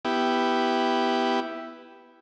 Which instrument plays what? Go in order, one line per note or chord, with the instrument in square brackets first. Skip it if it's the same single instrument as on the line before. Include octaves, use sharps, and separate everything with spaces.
[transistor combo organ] B3 E4 G4